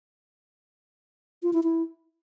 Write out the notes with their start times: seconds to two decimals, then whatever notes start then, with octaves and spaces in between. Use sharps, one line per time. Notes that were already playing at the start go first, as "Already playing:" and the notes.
1.43 F4
1.53 E4
1.64 E4